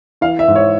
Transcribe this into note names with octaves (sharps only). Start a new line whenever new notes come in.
E3 F5
E5
G#2
C#5